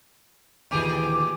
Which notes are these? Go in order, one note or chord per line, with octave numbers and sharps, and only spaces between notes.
D2 A#2 D#3 E3 G4 G#4 D6